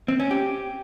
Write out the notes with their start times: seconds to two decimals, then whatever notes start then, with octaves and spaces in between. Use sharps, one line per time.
0.08 C4
0.20 C#4
0.31 G4